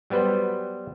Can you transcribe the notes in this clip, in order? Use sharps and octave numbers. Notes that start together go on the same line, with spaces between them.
F#3 G3 B3 B4 C5